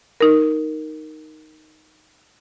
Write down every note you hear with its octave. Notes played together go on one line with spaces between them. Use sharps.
D#4 A#4